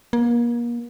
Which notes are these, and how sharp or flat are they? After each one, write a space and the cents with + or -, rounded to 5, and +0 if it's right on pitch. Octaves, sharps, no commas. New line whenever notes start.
A#3 +35